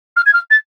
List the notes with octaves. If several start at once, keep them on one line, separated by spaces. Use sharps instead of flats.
F6
G#6
F6
A6